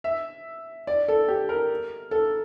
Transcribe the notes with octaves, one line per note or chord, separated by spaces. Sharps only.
E5
D5
A4
G4
A#4
A4